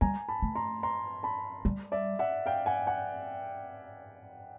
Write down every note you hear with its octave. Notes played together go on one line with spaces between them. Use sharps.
G3 G#5 A#5
A5 B5
A3
A#5 C6
A#5 C6
A5 B5
G3
D5 E5
E5 F#5
F5 G5
F#5 G#5
F#5 G#5